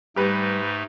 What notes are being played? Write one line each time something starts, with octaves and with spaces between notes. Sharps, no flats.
G#2 G3 A3 D#4 G4 B4